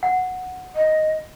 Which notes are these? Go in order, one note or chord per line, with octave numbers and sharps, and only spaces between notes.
F#5
D#5